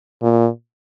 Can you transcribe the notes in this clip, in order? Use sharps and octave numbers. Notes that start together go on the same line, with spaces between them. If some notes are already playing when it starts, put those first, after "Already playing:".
A#2